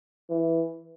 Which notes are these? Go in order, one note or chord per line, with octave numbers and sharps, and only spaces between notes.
E3